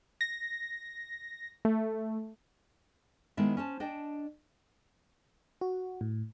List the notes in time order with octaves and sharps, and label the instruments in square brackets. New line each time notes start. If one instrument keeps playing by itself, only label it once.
[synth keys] A#6
A3
[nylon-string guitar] D#3 G#3 B3 E4 C5 E5
C#4 C5 A5
D4 D#5 G5 A5
[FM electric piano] F#4
A2